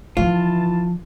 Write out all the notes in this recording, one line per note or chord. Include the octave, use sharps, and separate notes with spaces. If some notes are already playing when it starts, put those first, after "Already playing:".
D3 E3 F3 F4 A5